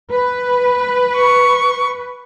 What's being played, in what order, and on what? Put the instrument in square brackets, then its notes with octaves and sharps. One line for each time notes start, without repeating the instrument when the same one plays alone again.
[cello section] B4
[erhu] C#6